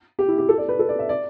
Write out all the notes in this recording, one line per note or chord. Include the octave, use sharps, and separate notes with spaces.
G4
E4
G4
A4
D5
B4
A4
D5
E5
D5